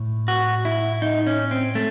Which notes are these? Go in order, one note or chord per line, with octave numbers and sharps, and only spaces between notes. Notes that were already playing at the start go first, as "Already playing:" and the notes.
Already playing: A2
F#4
E4
D#4
C#4
C4
A3